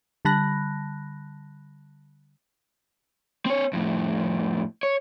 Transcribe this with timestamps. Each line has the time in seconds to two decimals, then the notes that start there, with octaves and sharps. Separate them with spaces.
0.25 D3 G3 A5 B5 F#6 A#6
3.46 C4 C#5
3.73 F2 A2
4.83 C#5